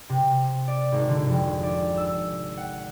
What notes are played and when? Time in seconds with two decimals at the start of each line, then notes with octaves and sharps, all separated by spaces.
0.09 C3
0.68 D5
0.92 G#1
1.09 D3
1.26 F1
1.63 D5
1.97 E6
2.57 F#5